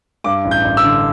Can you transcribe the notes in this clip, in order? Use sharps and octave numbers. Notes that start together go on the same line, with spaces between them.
G2 D6
A1
G6
A1
E6
D3